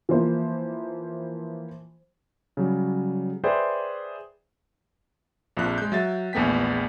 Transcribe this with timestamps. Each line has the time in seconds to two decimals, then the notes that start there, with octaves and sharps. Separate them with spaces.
0.09 E3 F3 A#3 C5
2.57 C#3 F#3 G3
3.44 G#4 B4 C5 D5 E5 G5
5.57 A#1 F2 F3 F#6
5.78 G#3 G6
5.92 F#3 E5 A6
6.33 A#1 E2 A3 B3 G5 B6